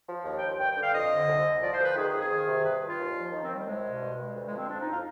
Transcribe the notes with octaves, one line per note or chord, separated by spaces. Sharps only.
F3
D#2
D#2 G5
G2 G5
D3 G5
F5
F2 D#5
D3
C2
C2
F3 D5
C5
D2 B4
D#3 G#4
G#4
F2
G#4
D#3
C3
G2 B4
G2
F4
D#2
F3
D#3
C4
D#2
G3
C2 G#3
B2
G2
G2
D2
G#3
F3
C4
F2 D4
D#4
F2
F4